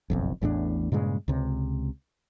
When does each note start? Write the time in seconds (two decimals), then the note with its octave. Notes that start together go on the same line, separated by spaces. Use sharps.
0.10 F#1 B1 F2
0.42 A1 E2 A2 D4
0.92 G2 A#2 C#3 G#3
1.28 C#2 C3